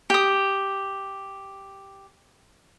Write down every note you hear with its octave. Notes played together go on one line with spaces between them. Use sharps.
G4 D#6